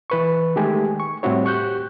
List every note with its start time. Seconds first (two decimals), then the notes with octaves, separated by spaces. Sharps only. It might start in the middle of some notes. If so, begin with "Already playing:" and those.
0.10 E3 B4 C#6
0.56 D#3 G#3 A3 G4 G#5
1.00 C#6
1.23 A2 G3 C4 E4 F#4 C#5
1.44 G4 C#6 F#6 G6